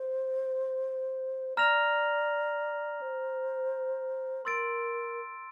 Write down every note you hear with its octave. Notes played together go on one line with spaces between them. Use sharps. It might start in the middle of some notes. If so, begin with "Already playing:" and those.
Already playing: C5
D5 A#5 F6 A#6 F7
C5
A#4 C6 E6 A6 D7